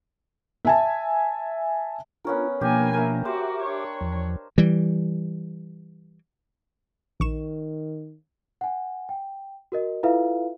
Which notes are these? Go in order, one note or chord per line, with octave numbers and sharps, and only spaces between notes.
E5 G#5 A5
B3 C#4 D4 F4 A#4
B2 F3 A#3 D4 G4 G#5
A#3 A#4 E5
F#4 G4 C5 E5 D6
D4 C#5
E2 F3
E3 G3
A#1 D#3 C#6 E7
F#5 G#5
G5
F#4 A#4 D#5
E4 F4 A4 B4 E5 F5